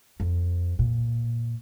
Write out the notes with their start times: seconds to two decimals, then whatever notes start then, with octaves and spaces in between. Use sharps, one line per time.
0.20 F2
0.79 A#2